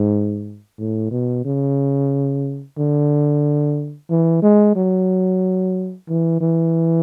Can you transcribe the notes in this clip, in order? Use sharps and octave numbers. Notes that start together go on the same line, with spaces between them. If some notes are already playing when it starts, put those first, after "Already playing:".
Already playing: G#2
A2
B2
C#3
D3
E3
G#3
F#3
E3
E3